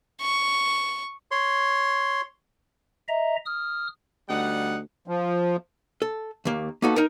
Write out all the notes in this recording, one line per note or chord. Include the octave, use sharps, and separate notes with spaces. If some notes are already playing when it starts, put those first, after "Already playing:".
C#6
C#5 C6
D#5 E5 A#5
D#6 F6
D2 G3 D#4 F#5
F3
A4
D#2 A#3
A#3 B3 D#4 F#4 A4
D#4 A#4